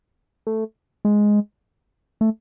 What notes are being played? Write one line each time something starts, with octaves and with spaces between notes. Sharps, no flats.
A3
G#3
A3